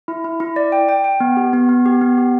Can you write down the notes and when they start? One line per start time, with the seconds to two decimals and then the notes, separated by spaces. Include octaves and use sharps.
0.08 E4
0.24 E4
0.40 E4
0.56 D5
0.72 G5
0.89 G5
1.04 G5
1.20 B3
1.37 G4
1.53 B3
1.69 B3
1.86 G4
2.01 B3
2.18 G4